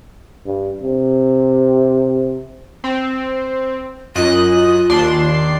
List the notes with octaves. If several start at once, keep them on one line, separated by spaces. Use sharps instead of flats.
G2
C3
C4
F#2 F4 D#5 F#6
D#2 D4 C6